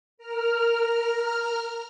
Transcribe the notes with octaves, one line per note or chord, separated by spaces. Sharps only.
A#4 F6